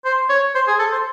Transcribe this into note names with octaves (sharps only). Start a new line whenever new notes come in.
C5
C#5
C5
G#4
A4
C5